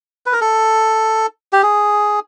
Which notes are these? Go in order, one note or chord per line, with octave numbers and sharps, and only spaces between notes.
B4
A#4
A4
G4
G#4